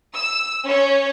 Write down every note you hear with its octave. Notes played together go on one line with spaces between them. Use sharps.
E6
C#4 C#5